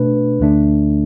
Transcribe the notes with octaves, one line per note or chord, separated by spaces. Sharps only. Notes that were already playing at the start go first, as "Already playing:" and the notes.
Already playing: B2 A3 D4 B4
D2 D3 A3 D4